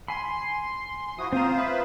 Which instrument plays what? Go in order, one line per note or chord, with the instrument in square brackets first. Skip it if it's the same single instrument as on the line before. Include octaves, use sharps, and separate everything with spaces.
[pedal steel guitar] G#5 B5 [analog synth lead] C6
[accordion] F3 E4 F#4 [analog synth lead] D#6
[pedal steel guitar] C4 A#5 [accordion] F4 C5
[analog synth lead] B4 [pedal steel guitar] E5 D#6